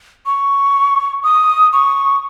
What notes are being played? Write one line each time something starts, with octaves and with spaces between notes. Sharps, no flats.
C#6
D#6
C#6